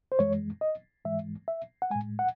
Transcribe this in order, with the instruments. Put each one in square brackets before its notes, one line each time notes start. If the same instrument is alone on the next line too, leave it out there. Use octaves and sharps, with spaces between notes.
[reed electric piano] C5
F#2 E3 G#3 C#5
D#5
G#2 E3 G#3 E5
E5
F#5
G#3 G#5
A2
F#5